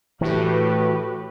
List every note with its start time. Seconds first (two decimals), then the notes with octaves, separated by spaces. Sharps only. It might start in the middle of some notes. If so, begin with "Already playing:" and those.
0.21 A2 E3 F#4 G4 B4